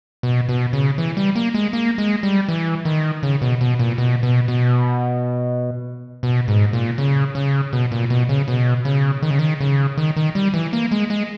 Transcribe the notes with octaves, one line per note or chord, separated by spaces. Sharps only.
B2
B2
C#3
E3
G3
A#3
G#3
A#3
G#3
G3
E3
D#3
C#3
B2
B2
A#2
B2
B2
B2
B2
G#2
A#2
C#3
C#3
B2
A#2
B2
C#3
B2
C#3
D#3
C#3
D#3
C#3
D#3
D#3
G3
E3
A#3
G#3
G#3